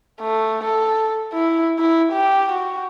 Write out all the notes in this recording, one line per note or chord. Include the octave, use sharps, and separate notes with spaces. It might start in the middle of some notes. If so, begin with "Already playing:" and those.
A3
A4
E4
E4
G4
F#4